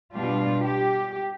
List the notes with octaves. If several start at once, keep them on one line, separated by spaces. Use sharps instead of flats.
B2 G3 D4 F4
G4